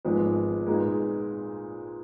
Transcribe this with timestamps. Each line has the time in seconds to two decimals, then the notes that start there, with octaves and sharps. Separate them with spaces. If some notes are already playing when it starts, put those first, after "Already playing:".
0.05 G#1 G#2 F3 G#3 B3
0.66 A#2 G#3 B3 D#4 G#4